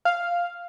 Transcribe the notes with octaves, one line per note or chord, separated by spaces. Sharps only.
F5